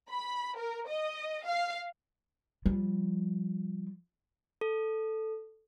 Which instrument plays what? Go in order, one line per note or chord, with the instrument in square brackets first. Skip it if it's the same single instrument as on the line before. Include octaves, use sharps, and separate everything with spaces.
[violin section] B5
A#4
D#5
F5
[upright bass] F3 [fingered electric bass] G3
[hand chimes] A4